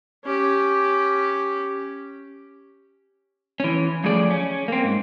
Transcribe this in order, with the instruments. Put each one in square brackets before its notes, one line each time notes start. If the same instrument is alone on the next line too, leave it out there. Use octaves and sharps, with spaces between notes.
[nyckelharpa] C#4 G4
[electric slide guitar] E3 C#4
F#2 F3 A3 G#4 D5
C#4
A#3 C4
G#2